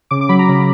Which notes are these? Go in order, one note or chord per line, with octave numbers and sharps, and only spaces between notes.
C#3 D6
D6
F#3 B5
A#5
C#3